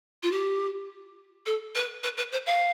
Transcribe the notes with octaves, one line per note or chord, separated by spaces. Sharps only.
F4
G4
A4
B4
B4
B4
C5
F5